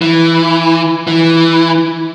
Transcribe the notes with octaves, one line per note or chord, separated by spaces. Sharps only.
E3
E3